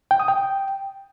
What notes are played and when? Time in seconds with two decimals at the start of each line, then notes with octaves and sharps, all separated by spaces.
0.11 G5
0.20 D#6
0.28 G5